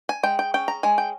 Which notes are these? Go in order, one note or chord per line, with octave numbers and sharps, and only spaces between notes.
G#5
G#3 G5
G5
C#4 G5
A#5
G#3 G#5
G5